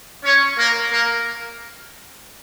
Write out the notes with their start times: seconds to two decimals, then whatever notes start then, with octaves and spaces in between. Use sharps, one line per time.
0.23 C#4 C#5
0.57 A#3 A#4
0.90 A#3 A#4